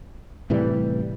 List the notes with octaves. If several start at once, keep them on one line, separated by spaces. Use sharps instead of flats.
A2 C3 E3 G3